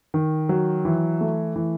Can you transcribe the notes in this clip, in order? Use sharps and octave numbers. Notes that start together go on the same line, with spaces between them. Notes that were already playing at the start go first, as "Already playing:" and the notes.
D#3
F#3
E3
A3
E3